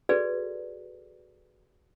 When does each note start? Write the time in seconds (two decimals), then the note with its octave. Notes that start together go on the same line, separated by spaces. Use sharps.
0.09 F#4 G#4 A4 B4 D5